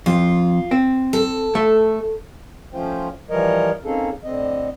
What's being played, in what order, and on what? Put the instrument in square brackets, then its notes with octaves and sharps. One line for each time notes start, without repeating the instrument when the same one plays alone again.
[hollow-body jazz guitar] F2 [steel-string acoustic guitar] F4
[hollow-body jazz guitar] C4
[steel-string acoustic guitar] A4
[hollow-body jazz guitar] A3
[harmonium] F3 A3 C#4 F4 C5 G5
E3 F3 G3 A#4 C#5 D#5
A#3 C4 C#4 D#4 G#4 A4
A2 D3 C4 D#5